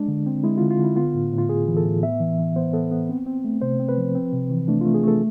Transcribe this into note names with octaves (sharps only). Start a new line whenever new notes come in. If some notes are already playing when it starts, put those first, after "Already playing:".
Already playing: G#3 D4
D3
C4
G#3 E4
F4
D3
F4
D3
E4
B3 F4
A2
A2
F4
A2 G#4
E3
A4
A2
B3 E5
E3
E3
B3 C5
B3 A4
B3
C4
C4
A3
C3 C5
C4
B4
F3
C4
C3
E3
A3 D4
A3 F4
G#4
A3 A4